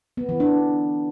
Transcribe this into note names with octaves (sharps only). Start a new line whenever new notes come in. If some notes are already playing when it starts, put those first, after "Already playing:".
B3
E3
D4